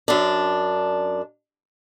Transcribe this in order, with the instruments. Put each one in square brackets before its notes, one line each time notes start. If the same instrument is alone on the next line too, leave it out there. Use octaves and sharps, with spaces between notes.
[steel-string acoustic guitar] F#2 D4